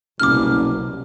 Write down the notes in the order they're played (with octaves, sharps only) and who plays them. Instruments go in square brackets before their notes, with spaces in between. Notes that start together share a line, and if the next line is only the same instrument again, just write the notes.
[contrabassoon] F#1 [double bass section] C2 B2 [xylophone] D6 F6